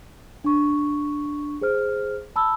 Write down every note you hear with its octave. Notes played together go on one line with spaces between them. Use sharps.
D4 C#6
G#4 C5 F6
A5 B5 E6